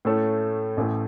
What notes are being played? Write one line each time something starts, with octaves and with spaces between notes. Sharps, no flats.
A2 A3 C#4 A4
A1 A2 A3